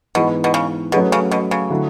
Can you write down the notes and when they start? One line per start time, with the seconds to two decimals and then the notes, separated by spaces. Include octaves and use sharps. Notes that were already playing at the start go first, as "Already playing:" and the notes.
0.15 G#2 B2 E3 B3
0.44 B2
0.54 C#3
0.92 B2 F#3 A3 C#4 G#4 B4
1.12 C#3
1.31 B2
1.51 C#3
1.70 D3 F#3 A3 E4